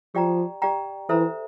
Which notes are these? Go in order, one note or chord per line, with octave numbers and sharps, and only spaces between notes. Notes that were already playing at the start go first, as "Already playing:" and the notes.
F3 G4 D5 G5 A#5
G4 D5 G5 A#5
E3 A4 C5 E5 A#5